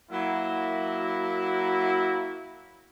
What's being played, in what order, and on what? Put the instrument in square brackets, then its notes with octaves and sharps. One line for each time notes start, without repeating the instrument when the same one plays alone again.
[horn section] F#3 A#3 E4